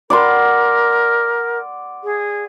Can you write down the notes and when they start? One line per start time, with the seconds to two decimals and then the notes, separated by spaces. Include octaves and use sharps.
0.10 A#4 D5 F#5 C6
2.03 G#4